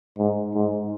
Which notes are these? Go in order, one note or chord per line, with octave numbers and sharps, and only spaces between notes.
G#2
G#2